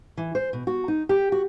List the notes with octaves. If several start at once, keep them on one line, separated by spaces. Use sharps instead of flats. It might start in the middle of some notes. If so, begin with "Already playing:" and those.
E3
C5
B2
F#4
D#4
G4
F#4